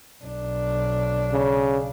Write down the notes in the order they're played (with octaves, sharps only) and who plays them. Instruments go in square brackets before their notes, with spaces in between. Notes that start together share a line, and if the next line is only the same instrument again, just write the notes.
[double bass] B1 D4
[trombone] C#3